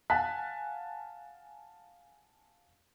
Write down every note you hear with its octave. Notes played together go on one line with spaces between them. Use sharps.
F5 F#5 G#5 A5 F#6 B6